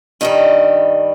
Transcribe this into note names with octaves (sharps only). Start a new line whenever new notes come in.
G2 D#3 G3 D#5